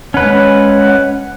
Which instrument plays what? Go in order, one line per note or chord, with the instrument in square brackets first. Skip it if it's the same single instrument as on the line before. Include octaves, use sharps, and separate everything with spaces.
[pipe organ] G#3 C#5 F#5 [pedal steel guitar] C#4 B4